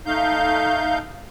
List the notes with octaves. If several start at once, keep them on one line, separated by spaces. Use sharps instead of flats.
A3 D#4 F5 G6